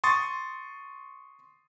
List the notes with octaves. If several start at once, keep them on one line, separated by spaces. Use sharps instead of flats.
C6 C#6 D#6 A6